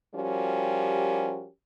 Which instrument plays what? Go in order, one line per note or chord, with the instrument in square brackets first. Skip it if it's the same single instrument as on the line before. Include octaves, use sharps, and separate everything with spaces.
[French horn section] F3 G3 C#4 F#4 G4 A#4